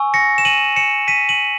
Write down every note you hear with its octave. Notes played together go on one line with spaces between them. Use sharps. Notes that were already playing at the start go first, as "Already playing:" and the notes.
Already playing: G#5 C#6 E6
A#6 C#7
E7
D#7 F#7
C#7 E7
B6 D#7
D#7 F#7